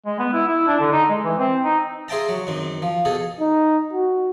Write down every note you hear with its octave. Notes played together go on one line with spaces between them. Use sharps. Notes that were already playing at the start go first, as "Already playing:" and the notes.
G#3
B3
E4
E4
D4
D3
D#4
G#3
E3
C4
D#4
G#4 C5 E5 G5 A5 A#5
F#3
F#2 D#3 C4
F3
B2 G#4 A4
D#4
F#4